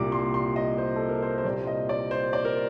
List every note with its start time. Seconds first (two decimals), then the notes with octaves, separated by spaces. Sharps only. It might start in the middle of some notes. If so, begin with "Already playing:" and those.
Already playing: C2 A#2 G3 D6
0.12 C6
0.34 C6
0.56 D#5
0.78 C5
0.96 A4
1.09 A#4
1.22 C5
1.38 C5
1.45 C2 A#2 G3 D5
1.67 D#5
1.89 D5
2.11 C5
2.33 D5
2.45 A#4